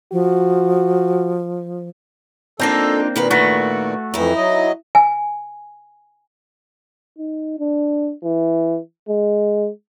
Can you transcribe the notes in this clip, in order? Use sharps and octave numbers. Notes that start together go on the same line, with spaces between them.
F3 F#4
A#3 C4 D4 D#4 F4 A4
A#2 D#3 B4 F5
D#3 A3 F#4 B4
F2 E3 D#4 E4
F#3 D#5
G#5
D#4
D4
E3
G#3